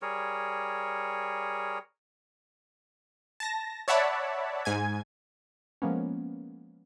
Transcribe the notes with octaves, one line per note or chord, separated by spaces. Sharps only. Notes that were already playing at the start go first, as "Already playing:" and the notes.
G3 G#4 A#4 C#5
A5 A#6
C#5 D5 E5 F#5 A5 B5
G#2 G#5 G#6
F3 G#3 A#3 B3 C#4